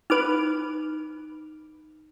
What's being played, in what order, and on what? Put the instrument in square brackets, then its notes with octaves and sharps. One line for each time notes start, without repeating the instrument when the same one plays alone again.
[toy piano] D#4 [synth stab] B4 D6 F6